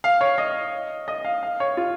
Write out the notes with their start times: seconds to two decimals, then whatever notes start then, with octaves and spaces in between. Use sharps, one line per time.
0.04 F5
0.21 C#5
0.38 D#5
1.08 D#5
1.25 F5
1.43 F5
1.60 C#5
1.77 F4